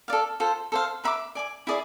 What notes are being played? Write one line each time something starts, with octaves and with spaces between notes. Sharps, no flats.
A4 D5 F5
F4 A4 C5
A4 C5 F5
B4 E5 B5 D6
D5 G#5 D6
E4 G#4 D5